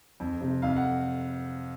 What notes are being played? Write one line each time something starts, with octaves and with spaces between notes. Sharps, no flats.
F2
C3
F2 F5
F#5